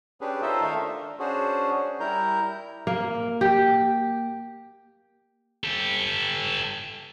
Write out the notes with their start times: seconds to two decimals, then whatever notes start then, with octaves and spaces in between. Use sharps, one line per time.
0.21 C#4 D4 G4 G#4 B4
0.42 D#4 F4 A4 C5 D#5 E5
0.61 D#3 A3 D#4 A#4 F5
0.81 D4
1.19 C#4 D4 F#4 G#4 C5
2.00 G3 E4 A#4 A#5 G6
2.87 A#3
3.41 G4
5.64 G4 A4